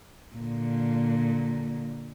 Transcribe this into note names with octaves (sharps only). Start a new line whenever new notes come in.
A#2 D3